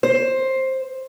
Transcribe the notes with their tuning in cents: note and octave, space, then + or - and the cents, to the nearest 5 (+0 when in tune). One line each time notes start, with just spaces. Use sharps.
C5 +10